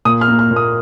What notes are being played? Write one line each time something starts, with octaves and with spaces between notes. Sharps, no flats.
A#2 D#6
F6
A#3
F6
A#2
D#6